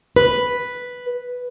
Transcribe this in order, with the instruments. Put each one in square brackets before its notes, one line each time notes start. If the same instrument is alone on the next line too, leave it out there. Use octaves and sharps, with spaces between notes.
[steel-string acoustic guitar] B4